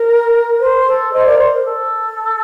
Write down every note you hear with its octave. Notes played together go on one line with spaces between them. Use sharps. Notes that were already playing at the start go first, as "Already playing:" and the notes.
Already playing: A#4
C5
A4
C5 D#5
A#4 D5
C5
A#4
A4